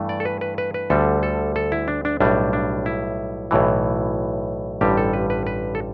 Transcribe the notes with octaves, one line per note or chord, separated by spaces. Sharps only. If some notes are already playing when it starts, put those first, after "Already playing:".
Already playing: G2 E3 A3
D5
A4
B4
B4
B4
B4
D2 D3 G3 A4
A4
A4
E4
D4
D4
B1 A2 G3 D4
D4
E4
B1 A2 E3
A1 G2 D3 G3 G4
A4
B4
B4
B4
A4